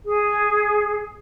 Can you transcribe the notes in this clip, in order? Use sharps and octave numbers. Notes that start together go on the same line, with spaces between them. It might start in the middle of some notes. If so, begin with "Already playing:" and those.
G#4